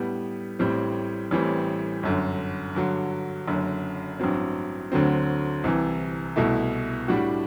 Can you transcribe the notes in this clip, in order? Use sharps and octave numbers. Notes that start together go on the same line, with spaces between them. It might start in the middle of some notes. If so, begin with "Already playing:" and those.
Already playing: A2 G3 B3
A1 A2 G3 C4
A1 A2 E3 G3 C4
G1 F#2 D3
G2 D3 F#3
F#1 F#2 D3
A1 G2 F#3 C4
D2 D3 F#3 C4
C2 C3 E3
C2 B2 A3 E4
A2 G3 D4 F#4